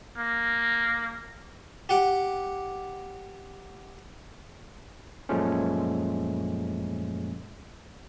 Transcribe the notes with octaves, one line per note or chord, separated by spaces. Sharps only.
A#3
G4 F#5 D6
F#2 A#2 F3 G#3 A3 C#4